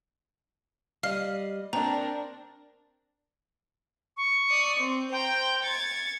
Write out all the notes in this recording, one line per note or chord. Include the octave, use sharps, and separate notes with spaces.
G3 D#5 F5 F6 C7
C4 D4 A#4 A#5
C#6
D5 D#6
C4
C5 G5 A#5
G#6 A6 C#7